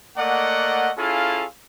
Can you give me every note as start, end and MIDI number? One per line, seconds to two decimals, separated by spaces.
0.16 0.90 57
0.16 0.90 58
0.16 0.90 74
0.16 0.90 75
0.16 0.90 78
0.98 1.45 61
0.98 1.45 64
0.98 1.45 65
0.98 1.45 68
0.98 1.45 69
0.98 1.45 77